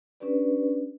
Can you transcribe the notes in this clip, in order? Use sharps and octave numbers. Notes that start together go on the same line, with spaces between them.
C#4 D4 G4 B4 D5